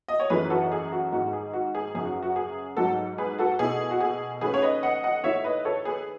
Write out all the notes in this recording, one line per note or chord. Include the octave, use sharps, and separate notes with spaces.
D#5
C#5
F#2 E3 A3 D#4 G#4 B4
F#4 A4
G#4
F#4
G#2 D#3 G#3 F#4
G#4
F#4
G#4
F#2 C#3 F#3 G#4
F#4
F#4
G#4
G#2 F#3 A3 F#4 A4
G#4 B4
F#4 A4
B2 A3 E4 G#4
F#4
G#4
D#3 A3 C#4 G#4 B4
C#5
B4 D#5
D#5 F#5
D#5 F#5
D#3 A3 E4 C#5 E5
B4 D#5
A4 C#5
G#4 B4